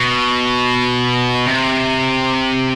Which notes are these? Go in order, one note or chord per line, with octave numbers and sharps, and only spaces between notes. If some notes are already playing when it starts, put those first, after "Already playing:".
Already playing: B2
C3